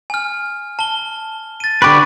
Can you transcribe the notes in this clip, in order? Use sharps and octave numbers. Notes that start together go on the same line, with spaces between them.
G#5 F6
A5 G7
A6 D#7
D3 G4 B4 C#6